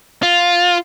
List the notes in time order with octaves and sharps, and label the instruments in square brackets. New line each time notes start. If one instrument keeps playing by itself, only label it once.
[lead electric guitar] F4